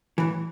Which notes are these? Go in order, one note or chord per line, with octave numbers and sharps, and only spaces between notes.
A2 E3